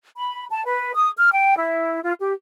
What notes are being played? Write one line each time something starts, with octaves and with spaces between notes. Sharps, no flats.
B5
A5
B4
D#6
F6
G5
E4
F4
G4